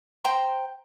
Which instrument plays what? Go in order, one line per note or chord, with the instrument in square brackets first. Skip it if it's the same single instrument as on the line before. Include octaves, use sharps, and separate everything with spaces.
[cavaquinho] C5 G5 A#5 C6